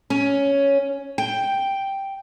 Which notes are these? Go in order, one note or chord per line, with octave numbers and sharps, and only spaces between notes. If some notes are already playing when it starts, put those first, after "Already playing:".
C#4
G5